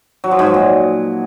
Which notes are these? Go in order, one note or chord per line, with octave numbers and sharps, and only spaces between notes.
F#3
F3
G#2
F#3
A#2